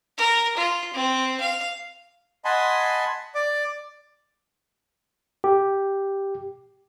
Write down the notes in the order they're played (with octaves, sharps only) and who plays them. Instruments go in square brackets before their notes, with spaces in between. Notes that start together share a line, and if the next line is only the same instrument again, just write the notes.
[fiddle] A#4
F4
C4
F5
[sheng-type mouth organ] D#5 F#5 G#5 A5 B5 C6
D5 D6
[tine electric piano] G4